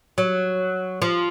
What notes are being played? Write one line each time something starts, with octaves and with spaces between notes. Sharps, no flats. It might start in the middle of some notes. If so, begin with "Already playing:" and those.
F#3
F3